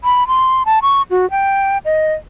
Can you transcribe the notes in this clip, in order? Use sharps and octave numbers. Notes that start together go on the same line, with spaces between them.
B5
C6
A5
C#6
F#4
G5
D#5